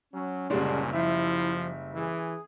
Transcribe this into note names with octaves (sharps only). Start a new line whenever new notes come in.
F#3 C#4
F#1 A#2 D3 G3 G#3 D4
F3 E4 E5
E3 G#4